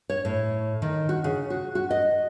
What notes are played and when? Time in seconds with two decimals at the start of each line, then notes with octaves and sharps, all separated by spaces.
0.10 C#5
0.25 A2
0.82 D#3
1.09 F#4
1.24 C#3
1.50 F#4
1.75 F#4
1.91 D#5